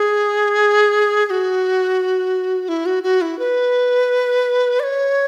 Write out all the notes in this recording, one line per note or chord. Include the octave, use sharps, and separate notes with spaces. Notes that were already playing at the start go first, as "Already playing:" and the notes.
Already playing: G#4
G#4
F#4
E4
F#4
F#4
E4
B4
D5
C#5